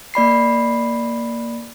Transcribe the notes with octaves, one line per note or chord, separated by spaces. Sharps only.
A#3 D5 B5 C7